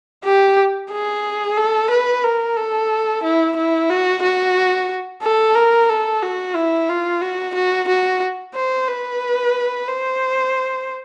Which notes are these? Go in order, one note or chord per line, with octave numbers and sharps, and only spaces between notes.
G4
G#4
A4
B4
A#4
A4
E4
E4
F#4
F#4
A4
A#4
A4
F#4
E4
F4
F#4
F#4
F#4
C5
B4
C5